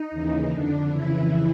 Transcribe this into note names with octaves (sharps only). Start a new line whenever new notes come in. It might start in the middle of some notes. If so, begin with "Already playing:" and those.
Already playing: D#4
D#2 C#3 E3
F2 D3 D4
F2 C#3 E3 E4